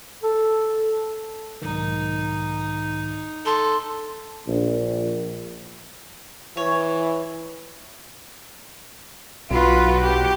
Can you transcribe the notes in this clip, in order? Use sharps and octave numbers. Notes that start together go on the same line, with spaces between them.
A4
B1 G#2 D#3 D#4
A4 C6
A#1
E3 C#5
B1 F4 F#4 B4
G4